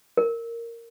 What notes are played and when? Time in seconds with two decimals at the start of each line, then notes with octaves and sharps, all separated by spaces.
0.17 A#4